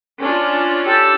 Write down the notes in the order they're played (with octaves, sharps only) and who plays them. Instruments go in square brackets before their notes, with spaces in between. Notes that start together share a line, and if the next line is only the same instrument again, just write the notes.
[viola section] C#4 D4 F4
[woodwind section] G4 A4